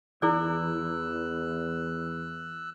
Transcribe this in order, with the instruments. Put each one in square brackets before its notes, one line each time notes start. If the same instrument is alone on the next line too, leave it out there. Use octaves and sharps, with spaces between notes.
[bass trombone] E2 [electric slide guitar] E3 [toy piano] E4 G#4 D5 [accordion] E6 F#6